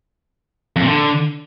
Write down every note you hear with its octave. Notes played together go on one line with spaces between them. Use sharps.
F2
A#2
D3